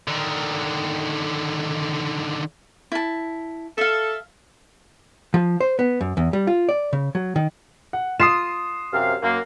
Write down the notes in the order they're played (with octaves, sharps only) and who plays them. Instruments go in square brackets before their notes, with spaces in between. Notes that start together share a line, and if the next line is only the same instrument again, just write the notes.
[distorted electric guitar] D3 D#3
[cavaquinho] E4 A5
[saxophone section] A4 [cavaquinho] E5 F5
[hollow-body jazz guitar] F3
C5
B3
F#2
E2
G3
F4
D5
C#3
F#3
D#3
[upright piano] F#5
[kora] F4 [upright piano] D#6 C7 E7
[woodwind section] F#2 C3 F5
F#2 A#3